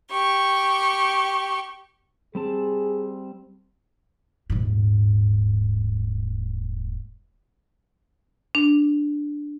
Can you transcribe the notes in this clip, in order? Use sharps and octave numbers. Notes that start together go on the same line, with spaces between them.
G4 C#6
G3 C4 G#4 A5
D#1 G#2
D4